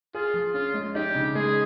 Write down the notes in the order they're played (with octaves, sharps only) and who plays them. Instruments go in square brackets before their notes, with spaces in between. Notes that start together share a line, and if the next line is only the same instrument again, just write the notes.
[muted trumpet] F4 [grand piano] G#4
[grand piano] F3
[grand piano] C#4 [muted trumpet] F4
[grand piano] G#3
[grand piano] D#4 [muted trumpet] G4
[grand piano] C#3
[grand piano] G#3 [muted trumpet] G#4